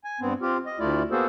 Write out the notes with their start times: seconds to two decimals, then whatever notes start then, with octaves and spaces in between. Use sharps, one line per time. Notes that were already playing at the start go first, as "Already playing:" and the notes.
0.04 G#5
0.21 G2 B3 C4
0.42 C4 F4 G4
0.66 D#5
0.79 D2 A3 E4 F4 D5
1.11 A#3 B3 F#4 G#4 A4 C5